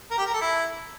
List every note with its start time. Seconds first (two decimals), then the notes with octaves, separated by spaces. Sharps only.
0.11 A#4
0.18 G4
0.26 A#4
0.33 A4
0.41 E4